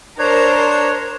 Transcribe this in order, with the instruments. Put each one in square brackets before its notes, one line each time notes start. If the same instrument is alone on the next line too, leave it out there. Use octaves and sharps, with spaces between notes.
[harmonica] D4 [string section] A#4 C5 [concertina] C#5